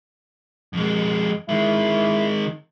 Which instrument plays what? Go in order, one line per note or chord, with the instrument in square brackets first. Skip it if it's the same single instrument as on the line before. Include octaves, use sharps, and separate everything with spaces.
[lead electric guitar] F2 G#3
[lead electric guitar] D#3 G#3 [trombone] E4